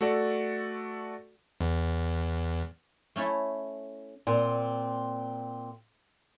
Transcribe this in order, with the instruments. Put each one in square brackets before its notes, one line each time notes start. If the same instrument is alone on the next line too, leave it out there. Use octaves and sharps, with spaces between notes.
[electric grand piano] A3 F#4 A4 D5
[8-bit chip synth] E2
[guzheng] A3 C#4 E4 A4
[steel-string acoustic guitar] A#2 C4